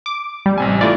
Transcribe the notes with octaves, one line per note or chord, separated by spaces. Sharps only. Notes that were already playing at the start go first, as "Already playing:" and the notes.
D6
G3
A1 C3 G#5
A3 E4 F4 D5